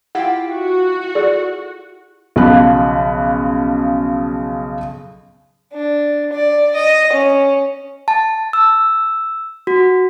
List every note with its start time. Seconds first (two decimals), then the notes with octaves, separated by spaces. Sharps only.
0.15 E4 F4 G4 F#5 G5
0.49 F#4
1.15 G#4 A4 D5
2.36 B1 C#3 F3 F5 B5 F#6
5.73 D4
6.33 D5
6.75 D#5
7.13 C#4
8.08 A5
8.53 E6
9.67 F#4